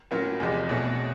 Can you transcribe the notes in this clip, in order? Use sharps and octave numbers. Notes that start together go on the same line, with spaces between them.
A2 F#3 A#3 C#4 F4
E2 C3 F3 G#3
B1 B2 F#3 A3